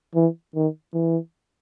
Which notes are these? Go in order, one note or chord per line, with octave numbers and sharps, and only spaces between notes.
E3
D#3
E3